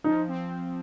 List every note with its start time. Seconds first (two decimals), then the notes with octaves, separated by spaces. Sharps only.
0.04 F3 D#4
0.28 C4